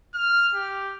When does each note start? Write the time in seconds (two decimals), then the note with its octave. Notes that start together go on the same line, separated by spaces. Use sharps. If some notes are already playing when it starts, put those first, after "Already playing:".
0.14 F6
0.54 G4